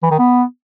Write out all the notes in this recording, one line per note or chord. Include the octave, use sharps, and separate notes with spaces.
E3
D#3
B3